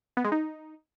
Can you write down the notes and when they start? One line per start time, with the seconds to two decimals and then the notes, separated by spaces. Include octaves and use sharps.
0.17 B3
0.24 G#3
0.32 D#4